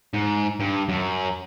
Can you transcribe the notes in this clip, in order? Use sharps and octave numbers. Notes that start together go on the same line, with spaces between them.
G#2
G2
F#2